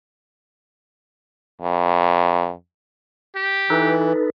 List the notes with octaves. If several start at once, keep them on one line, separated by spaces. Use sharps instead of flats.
F2
G4
E3 D#4 A4 B4